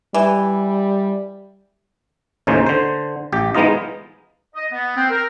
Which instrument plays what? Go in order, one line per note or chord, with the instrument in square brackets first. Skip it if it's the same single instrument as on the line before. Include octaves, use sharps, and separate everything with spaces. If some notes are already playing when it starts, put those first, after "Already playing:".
[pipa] E3 [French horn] G3
[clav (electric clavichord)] D#2 A2 C#3 D#4 G#4 C5
D3 C5
A1 G4
E3 G#3 B3 D#4 F4 D#5
[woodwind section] D#5
B3
C4
A#4